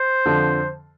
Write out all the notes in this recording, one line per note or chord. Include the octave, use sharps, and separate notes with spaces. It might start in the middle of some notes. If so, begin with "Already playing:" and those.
Already playing: C5
F2 D3 F3